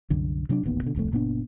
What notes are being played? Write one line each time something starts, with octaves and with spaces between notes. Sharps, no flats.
C2 F#2 D3
C3 F#3 C4 D4
D1 A1 D#2 B3
B2 D3
D1 C2 F2 A3
F#1 A#2 B3 D4